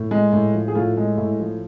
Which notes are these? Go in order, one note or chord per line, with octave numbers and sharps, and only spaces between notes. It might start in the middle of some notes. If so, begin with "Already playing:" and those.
Already playing: A2
G#3
A2
F3
G#4
A2 F4
G#3
A2 E4
F3